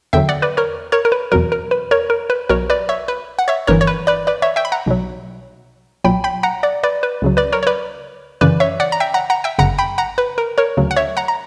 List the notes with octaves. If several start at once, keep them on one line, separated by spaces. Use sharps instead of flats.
E2 D3 F#3 E5 G5
D5 F#5
B4 D5
A#4 C#5
A#4 C#5
A#4
B4
E2 B2 F#3 A#4
A#4
B4
A#4 C#5
A#4
B4
B1 B2 F#3 A#4 C#5
B4 D5
C#5 E5
B4
F#5
C#5 E5
G1 G2 E3 A#4 C#5
C#5
B4
B4 D5
B4 D5
C#5 E5
E5 G5
B5
F#5 A#5
B1 B2 F#3
B1 A#2 F#3 G5 B5
G5 B5
F#5 A#5
D5 F#5
B4 D5
B4
C#2 C#3 F#3
B4 D5
A#4 C#5
C#5
B4 D5
F#2 C#3 E3 B4 D5
C#5 E5
D5 F#5
A#5
E5 G5
F#5 A#5
F#5 A#5
E5 G5
G1 F#2 C#3 F#5 A#5
G5 B5
F#5 A#5
B4
A#4
A#4 C#5
D2 C#3 F#3
F#5
C#5 E5
F#5 A#5
A#5